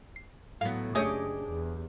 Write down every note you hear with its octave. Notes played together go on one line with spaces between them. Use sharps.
C7
A2 F#3 B3 F5
F#1 A3 D4 G4 G#4 C#5 D#5
E2